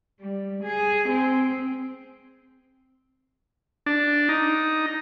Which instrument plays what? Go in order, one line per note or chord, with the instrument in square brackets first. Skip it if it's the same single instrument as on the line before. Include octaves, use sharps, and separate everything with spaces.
[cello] G3
G#4
C4
[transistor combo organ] D4
D#4